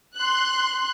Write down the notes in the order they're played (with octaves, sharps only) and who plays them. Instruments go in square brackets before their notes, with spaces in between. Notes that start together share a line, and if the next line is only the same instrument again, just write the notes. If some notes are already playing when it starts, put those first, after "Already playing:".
[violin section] C6 F#6